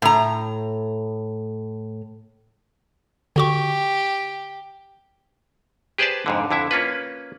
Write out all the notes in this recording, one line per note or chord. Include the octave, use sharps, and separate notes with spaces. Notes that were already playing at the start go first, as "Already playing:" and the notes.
A2 A#5
D3 F#4 G4 C#6
G4 G#4 B4 C5 D5 A5
F2 G#2 D3
F2 D3 E4 E5
A#3 C#4 F4 B4